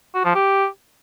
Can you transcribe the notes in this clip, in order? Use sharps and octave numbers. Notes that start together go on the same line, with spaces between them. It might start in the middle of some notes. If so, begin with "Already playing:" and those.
F#4
F3
G4